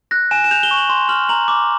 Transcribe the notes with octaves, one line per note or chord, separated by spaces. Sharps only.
F#6 A#6
G#5 E7
E7
G6 F7
G7
C#6
F#7
C6
F6 F#7
A#5 F#7
D6